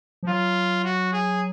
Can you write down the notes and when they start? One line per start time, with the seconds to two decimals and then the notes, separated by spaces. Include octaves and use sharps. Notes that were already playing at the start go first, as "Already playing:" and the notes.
0.23 F3
0.28 F#3 F4
0.84 F#4
1.13 G#4